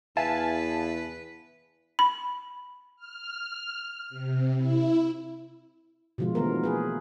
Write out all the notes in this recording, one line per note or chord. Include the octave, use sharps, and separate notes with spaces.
E2 B4 E5 F5 G#5 A5
B5
F6
C3
E4
B2 D3 F3 G#3 F4
D3 E3 A3 B3 A#4
A#3 G#4 B4